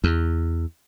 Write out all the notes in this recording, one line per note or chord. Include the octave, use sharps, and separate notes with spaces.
E2